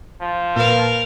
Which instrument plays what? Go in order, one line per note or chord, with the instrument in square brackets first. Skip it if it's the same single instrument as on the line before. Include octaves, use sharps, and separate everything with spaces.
[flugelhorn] F3
[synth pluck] A#2 E7 [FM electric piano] A#3 B4 [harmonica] A#4 F5